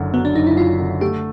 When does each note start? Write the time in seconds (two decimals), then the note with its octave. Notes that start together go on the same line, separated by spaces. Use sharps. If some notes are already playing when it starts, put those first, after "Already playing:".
Already playing: F#1 F#2 D3 F#3
0.14 F#3 B3
0.25 D4
0.35 F#1 D#4
0.47 E4
0.57 F#2 F4
0.80 D3
1.01 A3 G4